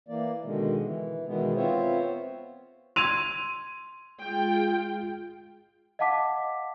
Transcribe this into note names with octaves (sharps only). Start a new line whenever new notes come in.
E3 A#3 D5
B2 D3 D#3 G#3
E3
B2 D#3 E3 G#3 B3
B3 C4 F4 C5 C#5 E5
C6 E6 G#6 D#7 F7
G#3 F4 G5
D#5 F5 F#5 A5 D6 B6